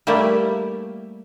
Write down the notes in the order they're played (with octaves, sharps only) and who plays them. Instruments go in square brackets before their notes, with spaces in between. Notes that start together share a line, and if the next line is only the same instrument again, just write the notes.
[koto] G3 A3 A#3 E4 G4